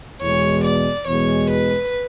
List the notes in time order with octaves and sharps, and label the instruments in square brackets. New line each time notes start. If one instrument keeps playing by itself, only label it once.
[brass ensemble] E2 B2 G#3 [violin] C#5
[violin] D5
[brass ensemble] E2 B2 G#3 [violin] C#5
[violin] B4